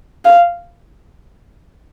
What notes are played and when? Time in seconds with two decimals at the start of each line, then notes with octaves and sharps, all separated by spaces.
0.25 F5